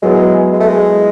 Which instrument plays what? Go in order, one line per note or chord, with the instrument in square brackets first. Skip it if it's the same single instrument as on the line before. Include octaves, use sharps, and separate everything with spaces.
[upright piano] F#3 B3 E4 G#4 [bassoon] G#3
[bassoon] G#3
A3
G#3